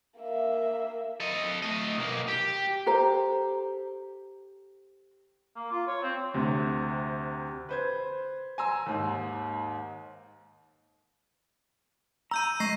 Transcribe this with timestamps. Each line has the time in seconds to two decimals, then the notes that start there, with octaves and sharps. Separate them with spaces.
0.18 A#3 E5
1.20 A4 D#5
1.62 A3 D#5
1.97 B1 A#3
2.28 G4
2.86 G4 A4 C5 A#5
5.56 A#3
5.71 F4
5.87 C#5
6.02 C4
6.34 D2 C3
7.69 B4 C5 G#6
8.58 G#5 A#5 C6 E6
8.86 D#2 G#2
12.31 A#5 E6 G6 D#7
12.60 G#3 C#6 A#6 C7